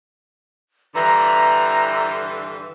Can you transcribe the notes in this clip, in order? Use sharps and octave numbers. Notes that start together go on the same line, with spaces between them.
G2 D3 E3 A#5